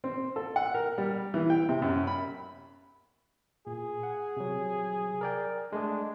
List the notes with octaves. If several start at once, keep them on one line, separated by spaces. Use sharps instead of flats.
C4
A4
F#5
A#4
G3
E3
G5
C3
F#2
B5
A#2 G#4
F#5
C3 F#3
A#4 D5 G5
G#3 A3 D4 G#4